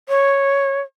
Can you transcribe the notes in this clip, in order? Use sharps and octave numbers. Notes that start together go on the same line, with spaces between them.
C#5